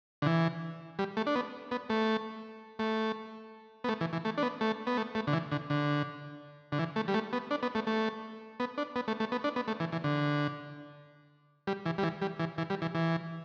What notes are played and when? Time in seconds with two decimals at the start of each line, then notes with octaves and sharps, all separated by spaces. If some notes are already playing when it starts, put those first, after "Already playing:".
0.22 D3
0.26 E3
0.99 G3
1.17 A3
1.27 D4
1.35 B3
1.71 B3
1.90 A3
2.79 A3
3.84 B3
3.89 A3
4.01 E3
4.13 E3
4.25 A3
4.38 D4
4.43 B3
4.61 A3
4.87 B3
4.97 A3
5.15 A3
5.27 D3
5.33 E3
5.51 D3
5.70 D3
6.72 D3
6.79 E3
6.96 A3
7.08 G3
7.14 A3
7.33 B3
7.51 D4
7.63 B3
7.75 A3
7.87 A3
8.60 B3
8.78 D4
8.96 B3
9.08 A3
9.20 A3
9.32 B3
9.44 D4
9.56 B3
9.68 A3
9.80 E3
9.92 E3
10.04 D3
11.67 G3
11.86 E3
11.98 G3
12.03 E3
12.22 G3
12.39 E3
12.58 E3
12.70 G3
12.82 E3
12.95 E3